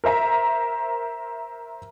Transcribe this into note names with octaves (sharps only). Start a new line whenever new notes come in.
A#4 C5 E5 A#5